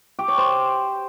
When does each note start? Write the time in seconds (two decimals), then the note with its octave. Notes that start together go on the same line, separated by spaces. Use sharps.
0.19 G4
0.28 C#5
0.38 C5